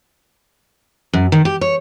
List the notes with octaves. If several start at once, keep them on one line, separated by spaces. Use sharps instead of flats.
F#2
D#3
G4
C#5